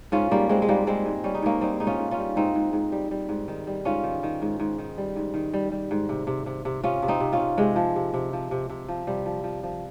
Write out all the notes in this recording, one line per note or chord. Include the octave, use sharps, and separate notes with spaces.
G#2 C#4 F4
G#2 G3 A#3
G3 G#3 C4
G#3
G#2 G3 A#3
G3 G#3 C4
G#2
G3 C#4
D#4
G#2 A#3 C#4
G3 C4 D#4
G#2 D#4
C#4 F4
G#2
C#4 F4
G3
G#2 C4 D#4
G#2
G#2
G3
G3
G#2
D#3
G3
G#2 C#4 F4
D#3
D#3
G#2
G#2
D#3
G3
G#2
D#3
G3
G3
G#2
C3
C3
C3
C3
C3 C#4 F4
C3
C4 D#4
C3
C#4 F4
C3
C3 G#3
F3
C3
C3
F3
C3
C3
F3
C3 G3
F3
F3
F3